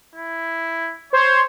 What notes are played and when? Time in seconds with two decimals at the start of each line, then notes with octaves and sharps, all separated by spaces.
0.15 E4
1.13 C5 C#5